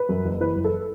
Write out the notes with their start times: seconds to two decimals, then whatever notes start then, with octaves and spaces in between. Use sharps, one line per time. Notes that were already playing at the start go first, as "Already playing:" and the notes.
Already playing: B4
0.09 F#2
0.25 F#1
0.40 E3 B4
0.56 F#1
0.64 A4